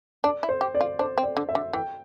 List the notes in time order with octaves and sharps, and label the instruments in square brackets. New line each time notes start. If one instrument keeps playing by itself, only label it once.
[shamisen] D4 [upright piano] D5
[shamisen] E4
[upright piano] C5
[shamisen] G4
[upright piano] D5
[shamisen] F4
[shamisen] D4 [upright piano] C5
[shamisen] C4
[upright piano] D5
[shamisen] D3
[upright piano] E5
[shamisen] D3
[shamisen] E3 [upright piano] G5